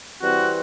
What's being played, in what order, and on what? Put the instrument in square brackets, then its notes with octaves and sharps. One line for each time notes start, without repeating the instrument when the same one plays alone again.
[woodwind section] E3 G3 C4 F#4